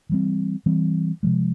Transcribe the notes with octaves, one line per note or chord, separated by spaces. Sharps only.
E3 G3 C4
E3 G3 C4
C3 F3 G#3